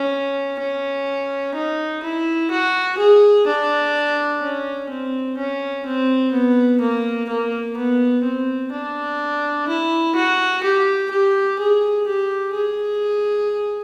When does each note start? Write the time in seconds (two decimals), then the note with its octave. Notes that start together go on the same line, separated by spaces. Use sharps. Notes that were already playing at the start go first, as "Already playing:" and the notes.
Already playing: C#4
0.59 C#4
1.55 D#4
2.03 E4
2.51 F#4
2.98 G#4
3.47 D4
4.41 C#4
4.90 C4
5.38 C#4
5.86 C4
6.32 B3
6.81 A#3
7.29 A#3
7.77 B3
8.24 C4
8.72 D4
9.68 E4
10.15 F#4
10.64 G4
11.11 G4
11.59 G#4
12.07 G4
12.55 G#4